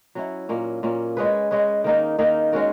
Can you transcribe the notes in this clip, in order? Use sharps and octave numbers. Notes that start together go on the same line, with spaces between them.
F#3 C#4 E4
A#2 A#3 C#4
A#2 A#3 C#4
G#3 C#4 G#4 B4
G#3 C#4 G#4 B4
D#3 A#3 D#4
D#3 A#3 D#4
G#3 C#4 F#4 A#4